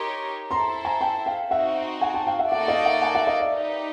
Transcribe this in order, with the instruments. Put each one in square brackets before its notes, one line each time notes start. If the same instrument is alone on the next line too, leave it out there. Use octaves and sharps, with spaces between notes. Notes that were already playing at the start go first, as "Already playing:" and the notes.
Already playing: [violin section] D#4 G4 A#4 C#5 [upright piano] A#5 C6
[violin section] E4 A4 C5 [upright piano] A#5 C6
[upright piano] G#5 A#5
G5 A5
F5 G5
[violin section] C4 D#4 F#4 [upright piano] E5 F#5
[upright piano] F#5 G#5
G5 A5
F5 G5
E5 F#5
[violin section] A#3 D#4 F#4 A4 D5 [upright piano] E5 F#5
[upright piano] D#5 F5
E5 F#5
F#5 G#5
E5 F#5
D#5 F5
D5 E5
[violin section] D#4 G4 B4